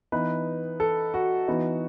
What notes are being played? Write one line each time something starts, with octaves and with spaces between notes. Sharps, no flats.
E3 B3 D#4 B4
A4
F#4
E3 B3 D#4